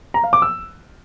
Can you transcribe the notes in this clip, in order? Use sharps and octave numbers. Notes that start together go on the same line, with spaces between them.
A#5
F5
D6
E6